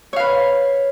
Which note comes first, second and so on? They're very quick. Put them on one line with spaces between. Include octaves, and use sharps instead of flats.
C#5 F5 B4